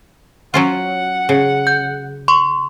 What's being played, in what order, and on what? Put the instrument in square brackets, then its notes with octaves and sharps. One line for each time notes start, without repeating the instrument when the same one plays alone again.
[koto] F#3 C#4 F4 [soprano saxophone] F#5
[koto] C#3
[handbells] G6
C6 C#6